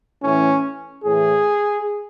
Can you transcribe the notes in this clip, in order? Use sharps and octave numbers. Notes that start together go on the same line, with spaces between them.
A2 E3 C#4
A2 E3 G#4